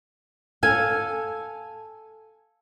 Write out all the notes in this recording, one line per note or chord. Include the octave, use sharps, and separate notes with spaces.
A4 F5 G#5